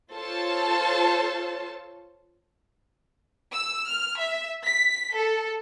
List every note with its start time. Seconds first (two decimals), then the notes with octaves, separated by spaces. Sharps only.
0.13 F4 A4 C5 C#5 A5
3.55 E6
3.89 F6
4.20 E5
4.64 B6
5.14 A4